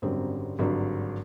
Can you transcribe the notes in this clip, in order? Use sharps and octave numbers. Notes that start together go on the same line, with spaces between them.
G#1 F#2 D3 G3 C4
G#1 G2 D3 F#3